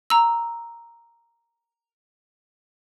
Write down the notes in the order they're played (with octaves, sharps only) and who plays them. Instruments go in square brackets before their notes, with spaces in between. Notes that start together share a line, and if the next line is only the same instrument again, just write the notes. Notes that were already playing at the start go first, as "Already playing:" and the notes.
[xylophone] A#5 E6